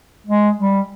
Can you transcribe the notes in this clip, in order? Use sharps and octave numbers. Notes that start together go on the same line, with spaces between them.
G#3
G3